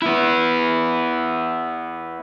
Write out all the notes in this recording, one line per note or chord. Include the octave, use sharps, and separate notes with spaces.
B3 E4